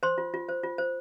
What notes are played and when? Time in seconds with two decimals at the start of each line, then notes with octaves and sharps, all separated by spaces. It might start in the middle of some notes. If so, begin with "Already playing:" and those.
0.03 C5 C6
0.18 F4
0.34 F4
0.49 C5
0.63 F4
0.78 C5